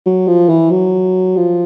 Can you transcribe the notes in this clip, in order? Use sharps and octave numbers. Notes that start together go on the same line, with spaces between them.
F#3
F3
E3
F#3
F3